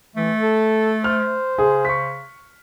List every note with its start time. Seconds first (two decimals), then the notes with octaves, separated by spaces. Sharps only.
0.16 E3 A3
0.40 A4
1.04 C5 F6
1.58 C#3 G#4
1.85 C#6 B6